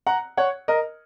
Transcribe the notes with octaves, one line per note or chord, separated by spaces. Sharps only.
F#5 A#5
C#5 F#5
A#4 D#5